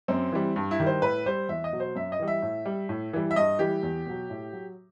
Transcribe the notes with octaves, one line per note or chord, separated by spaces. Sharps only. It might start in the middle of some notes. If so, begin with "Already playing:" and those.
F#2 C4
E3 G3
G2
E4
D#3 G3
C5
A2 B4
G3 C5
E2 E5
D#5
B2 F#3
C5
F#2 E5
D#5
E3 G3
E5
A2
G3
A2
E3 G3
E5
G2 D#5
E3 G3 G4
E2
B2 F#3
A2
F#3